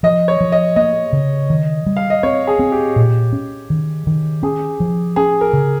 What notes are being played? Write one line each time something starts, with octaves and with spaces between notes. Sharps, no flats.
F3 D#5
C#5
F3
D#5
A#3 D#5
C#3
D#3
G3
F5
D#5
C4 C#5
G#4
C4
G4
A#2
C#4
D#3
D#3
C#4 G#4
F3
C#4 G#4
A#4
C#3